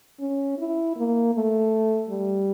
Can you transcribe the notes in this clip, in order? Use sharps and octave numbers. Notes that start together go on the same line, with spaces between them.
C#4
E4
A#3
A3
G3